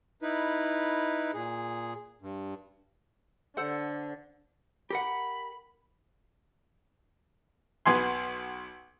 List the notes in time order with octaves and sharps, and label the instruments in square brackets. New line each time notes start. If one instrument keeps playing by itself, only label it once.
[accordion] D#4 E4 B4
A#2 G#4
G2
[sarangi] D3 [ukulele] A4 C5 F#5
[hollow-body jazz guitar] G4 A#4 F#5 [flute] B5
[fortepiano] B1 B3 G#5 C6